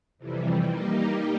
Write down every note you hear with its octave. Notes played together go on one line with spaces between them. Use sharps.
F2 C3 E3 G3
G3 A#3 D#4 G4